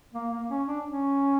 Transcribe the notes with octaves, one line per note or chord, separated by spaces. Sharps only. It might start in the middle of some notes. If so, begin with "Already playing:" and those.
A#3
A#3
C#4
D4
C#4